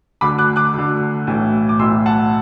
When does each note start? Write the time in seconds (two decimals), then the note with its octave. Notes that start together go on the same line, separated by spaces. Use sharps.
0.21 D2 D3 B5 D6
0.38 D6 F#6
0.56 D6 F#6
0.73 D2 D3
1.27 B1 A2 E3
1.69 D6
1.79 B1 A2 E3 C6 E6
2.06 F#5 A5